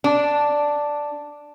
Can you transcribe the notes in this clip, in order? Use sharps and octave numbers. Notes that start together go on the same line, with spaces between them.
D4